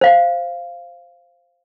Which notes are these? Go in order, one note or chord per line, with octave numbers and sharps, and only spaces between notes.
C5 F5